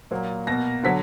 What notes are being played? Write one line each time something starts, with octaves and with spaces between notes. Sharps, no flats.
A#2 F#3 A#3
B2 A#3 A#6
D3 F#3 B6